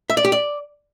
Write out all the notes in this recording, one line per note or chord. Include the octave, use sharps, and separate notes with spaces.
E5
D5
G4
D5